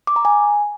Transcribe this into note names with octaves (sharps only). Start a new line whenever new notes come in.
D6
A#5
G#5